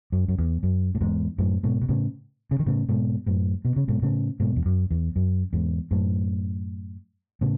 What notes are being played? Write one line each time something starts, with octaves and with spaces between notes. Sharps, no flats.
F#2
F#2
E2
F#2
A2
E2 G#2
F#2 A2
G#2 B2
B2
A2 C#3
C#3
D#3
A2 C#3
G#2 B2
F#2 A2
B2
C#3
G#2 B2
A2 C#3
G#2 B2
E2
F#2
E2
F#2
E2 G#2
F#2 A2
A2 C#3